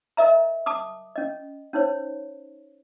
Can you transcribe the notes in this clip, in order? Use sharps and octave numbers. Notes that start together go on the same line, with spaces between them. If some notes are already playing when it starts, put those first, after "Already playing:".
A#4 D#5 E5 A#5
A5 D6 D#6
C#4 D#5
C#4 D#4 C5 C#5